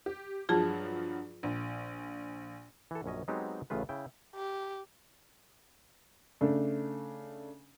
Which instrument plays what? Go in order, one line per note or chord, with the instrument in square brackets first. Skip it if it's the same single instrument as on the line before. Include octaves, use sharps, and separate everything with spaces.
[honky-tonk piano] G4
[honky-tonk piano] G2 F3 F#3 [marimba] F4 G#4 A5
[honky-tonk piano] A#1
[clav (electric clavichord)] E3 A4
A#1 F#2 C#4 D#5
F#3 G#3 B3 C4 D#4 G4
A1 A2 C#3 F4 B4
C#3 E4 G5
[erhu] G4
[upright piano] C#3 A3 D4